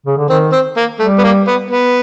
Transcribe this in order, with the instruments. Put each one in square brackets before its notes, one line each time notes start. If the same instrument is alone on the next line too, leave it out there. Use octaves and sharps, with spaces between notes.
[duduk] C#3
D3
[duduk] D#3 [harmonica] C4
[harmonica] C4
A#3
[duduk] G3 [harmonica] A3
[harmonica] B3
A#3
B3
B3